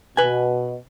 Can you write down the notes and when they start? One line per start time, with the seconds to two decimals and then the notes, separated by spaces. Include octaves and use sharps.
0.17 B2 B4 G#5